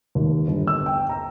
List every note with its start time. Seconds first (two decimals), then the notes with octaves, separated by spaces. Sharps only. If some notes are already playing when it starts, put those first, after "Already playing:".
0.15 D#2
0.48 G1
0.67 E6
0.86 G5
1.09 A#5